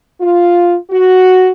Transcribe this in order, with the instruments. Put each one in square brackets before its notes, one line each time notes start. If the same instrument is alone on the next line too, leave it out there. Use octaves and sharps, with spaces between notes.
[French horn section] F4
F#4